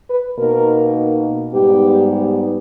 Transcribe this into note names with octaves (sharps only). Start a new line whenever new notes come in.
B4
B2 A#3 D#4 A#4
G#2 G3 B3 D#4 G4